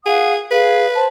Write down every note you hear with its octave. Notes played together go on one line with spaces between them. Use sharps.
G#4 F5 F#5 D#6
G#4 B4 F5
C5 A5